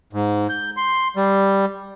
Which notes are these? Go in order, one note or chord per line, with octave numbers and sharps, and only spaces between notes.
G#2
G6
C6
G3